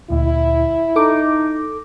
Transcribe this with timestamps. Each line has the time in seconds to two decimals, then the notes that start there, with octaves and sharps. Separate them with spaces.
0.10 D2 A#2 E4
0.96 D#4 A4 D6